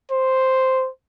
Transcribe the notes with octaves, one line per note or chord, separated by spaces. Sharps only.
C5